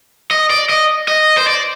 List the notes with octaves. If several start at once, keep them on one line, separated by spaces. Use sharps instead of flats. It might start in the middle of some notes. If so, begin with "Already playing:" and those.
D#5
D5
D#5
D#5
C5
D5